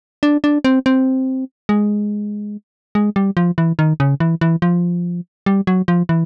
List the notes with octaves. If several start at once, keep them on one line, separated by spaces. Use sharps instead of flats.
D4
D4
C4
C4
G#3
G#3
G3
F3
E3
D#3
C#3
E3
E3
F3
G3
F#3
F3
E3